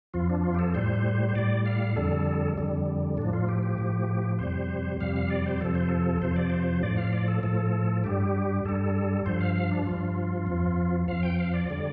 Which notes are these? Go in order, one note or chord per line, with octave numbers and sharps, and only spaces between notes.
F2 F3 F4
D4
F4
G4
A4
A2 G3 C5
C5
A2 G3 D5
F5
F2 D3 G3 A4
F2 D3 G3
A2 F3 D4
F4
G4
G4
A2 F3
F2 C3 G3 C5
F2 C3 G3 F5
F5
D5
C5
F2 C3 F3 A4
C5
A4
F2 C3 F3 C5
D5
C5
A2 F3 D5
F5
D5
A4
A2 F3 A4
G2 G3 G4
G2 G3 A4
G2 F3 C5
F5
F5
D4
G2 F3 F4
F2 F3
F2 F3 F5
G5
F5
D5
D3 G3